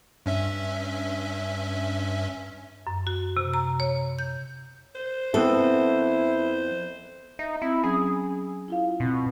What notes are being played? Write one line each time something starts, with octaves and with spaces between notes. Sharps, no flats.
G2 C#4 E5
F#2
F#4
C3
A#5
C#5
G6
C5
F2 B3 C4 E4 A4
D#4 E5
C4 E4
F#3 C#4 G#4
E4 F4 F5
B2 C4